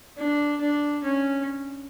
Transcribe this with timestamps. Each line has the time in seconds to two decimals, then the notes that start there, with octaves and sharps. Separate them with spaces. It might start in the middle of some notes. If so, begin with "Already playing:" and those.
0.18 D4
0.61 D4
1.04 C#4